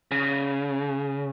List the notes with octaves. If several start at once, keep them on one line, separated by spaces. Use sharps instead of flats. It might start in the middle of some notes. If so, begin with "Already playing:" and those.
C#3